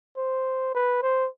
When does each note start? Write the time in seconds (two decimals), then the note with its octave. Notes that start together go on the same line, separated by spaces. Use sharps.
0.17 C5
0.74 B4
1.02 C5